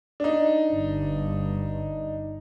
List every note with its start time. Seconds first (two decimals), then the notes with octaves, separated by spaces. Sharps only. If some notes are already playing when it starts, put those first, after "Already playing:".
0.20 D4 D#4
0.71 G1 G2